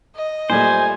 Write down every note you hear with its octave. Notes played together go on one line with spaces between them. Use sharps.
D#5
A#2 G3 A3 C5 G#5